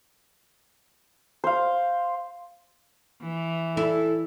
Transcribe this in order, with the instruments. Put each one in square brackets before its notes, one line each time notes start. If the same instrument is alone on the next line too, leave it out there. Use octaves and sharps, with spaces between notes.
[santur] C5 F5
[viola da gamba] E3
[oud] E4 [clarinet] A4